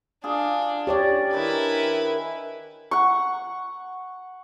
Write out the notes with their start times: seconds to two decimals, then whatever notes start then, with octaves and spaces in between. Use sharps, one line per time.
0.24 D4 F4 G#4
0.87 G4 C#5 D5
1.33 D#3 D4 E4 B4
2.91 F#5 C#6